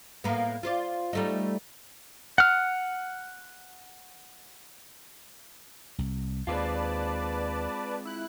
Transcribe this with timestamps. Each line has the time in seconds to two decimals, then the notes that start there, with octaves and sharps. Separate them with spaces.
0.24 A2 A#3 B3
0.63 F4 C5 D5
1.13 G3 A3 D#4
2.38 F#5 F6
5.98 C2
6.47 D#2 G#3 C4 F4 B4 D5 A5
8.05 E4 F#6